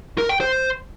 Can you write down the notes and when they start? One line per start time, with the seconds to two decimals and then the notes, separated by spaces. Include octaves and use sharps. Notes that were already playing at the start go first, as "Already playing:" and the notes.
0.18 A#4
0.29 G5
0.40 C5